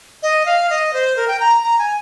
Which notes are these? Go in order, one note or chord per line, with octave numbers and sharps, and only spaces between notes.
D#5
F5
D#5
C5
A#4
G5
A#5
A#5
G#5